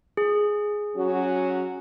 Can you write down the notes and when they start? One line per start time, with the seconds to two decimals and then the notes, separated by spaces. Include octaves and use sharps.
0.17 G#4
0.95 F#3 C#4 F#4